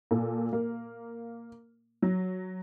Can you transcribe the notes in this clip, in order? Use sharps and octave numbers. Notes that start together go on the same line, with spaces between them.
A#2 A4
A#3
F#3